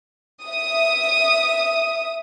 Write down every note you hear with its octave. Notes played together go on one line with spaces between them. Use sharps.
E5 D#6